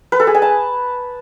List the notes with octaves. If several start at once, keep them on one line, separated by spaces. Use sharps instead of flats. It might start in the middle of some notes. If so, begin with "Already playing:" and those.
B4
A4
G#4
G#5
A5